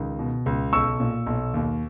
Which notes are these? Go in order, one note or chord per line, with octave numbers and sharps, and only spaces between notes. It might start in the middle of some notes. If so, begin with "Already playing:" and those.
Already playing: C#2 D#3
B2
C#2
B1 C#6 E6
A#2
B1
D#2